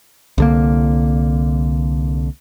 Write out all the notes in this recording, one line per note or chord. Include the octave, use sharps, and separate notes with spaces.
C2 D3 A#3